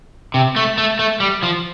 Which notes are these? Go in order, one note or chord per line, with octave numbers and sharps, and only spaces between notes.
C3
A3
A3
A3
G3
F3